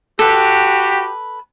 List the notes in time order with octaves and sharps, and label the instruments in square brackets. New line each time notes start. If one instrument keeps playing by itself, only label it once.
[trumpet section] F#4 G4 [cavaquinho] A4 B4